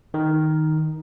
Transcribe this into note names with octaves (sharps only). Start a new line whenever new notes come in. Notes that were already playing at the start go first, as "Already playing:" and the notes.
D#3 A#4